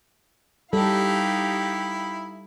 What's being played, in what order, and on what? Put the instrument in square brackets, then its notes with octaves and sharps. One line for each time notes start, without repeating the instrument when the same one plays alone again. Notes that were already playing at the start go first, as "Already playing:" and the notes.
[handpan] G3 A4 [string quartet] D#4 G4 F5 [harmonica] E4